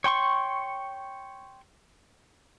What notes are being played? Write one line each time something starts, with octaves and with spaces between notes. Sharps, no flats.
C#5 G5 C6 C#6